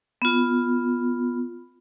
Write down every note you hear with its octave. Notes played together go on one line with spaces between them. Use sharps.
B3 F4